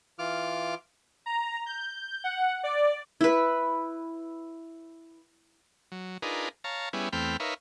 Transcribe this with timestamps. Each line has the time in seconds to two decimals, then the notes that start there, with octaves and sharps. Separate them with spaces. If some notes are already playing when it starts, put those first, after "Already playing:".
0.19 E3 F4 D6 F6
1.26 A#5
1.66 G6
2.24 F#5
2.63 D5
3.21 E4 B4
5.92 F#3
6.22 D4 D#4 F4 G#4 A#4 B4
6.64 C#5 F5 A5 A#5
6.93 G3 B3 C#4 E4 G#4
7.13 E2 A3 C4 G5 B5 F6
7.40 D#4 A#4 B4 C#5 E5 F5